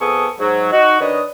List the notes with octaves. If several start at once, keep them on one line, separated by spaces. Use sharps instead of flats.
F2 B3 G#4 A4 C#6 D#6
G#2 F#3
D#4 F#4
D#3 D4 B4 C#5 D#5